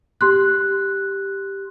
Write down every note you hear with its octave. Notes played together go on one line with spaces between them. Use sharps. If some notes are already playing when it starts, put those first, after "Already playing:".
G4 C6 F#6